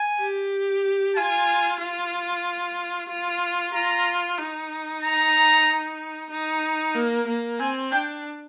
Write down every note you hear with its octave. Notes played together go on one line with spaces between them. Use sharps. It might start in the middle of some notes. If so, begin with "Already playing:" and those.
Already playing: G#5
G4
F4 G#5
F4
F4
F4 A#5
D#4
A#5
D#4
A#3
A#3
C4 G#5
D4 G5